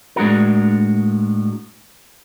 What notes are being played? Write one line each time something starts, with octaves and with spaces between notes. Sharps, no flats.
A2 G#3 D4 F#4 A#4